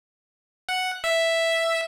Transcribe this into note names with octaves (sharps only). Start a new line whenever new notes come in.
F#5
E5